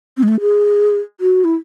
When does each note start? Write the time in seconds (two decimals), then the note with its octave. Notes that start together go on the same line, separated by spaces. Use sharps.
0.17 C4
0.23 G#3
0.28 A3
0.41 G#4
1.20 F#4
1.44 E4